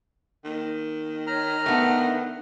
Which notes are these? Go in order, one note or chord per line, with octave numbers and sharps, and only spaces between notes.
D#3 A#3
C#5 A#5 F6
A3 B3 D4